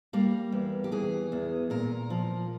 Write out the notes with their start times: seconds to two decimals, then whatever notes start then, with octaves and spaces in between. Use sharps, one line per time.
0.13 G3 A#3
0.52 E2
0.84 G4
0.92 E3 G#4
1.32 E2
1.70 A#2 A#4
2.10 F3